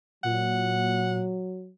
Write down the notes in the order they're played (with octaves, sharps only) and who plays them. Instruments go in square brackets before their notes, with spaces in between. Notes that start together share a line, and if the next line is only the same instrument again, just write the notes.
[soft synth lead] A#2 [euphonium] F#3 [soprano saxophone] F#5